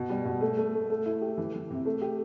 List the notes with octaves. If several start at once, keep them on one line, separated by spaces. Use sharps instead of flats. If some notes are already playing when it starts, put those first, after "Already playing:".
Already playing: B2
G3
B2
A3
A3
A3
A3
E4
G4
E3
E3
C3
A3
G4